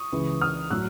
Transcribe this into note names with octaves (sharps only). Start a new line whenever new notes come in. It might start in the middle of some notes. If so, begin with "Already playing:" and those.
Already playing: C#6 D#6
C#2 C#3 E3
D#6 F6
A2 F#3 E6 F#6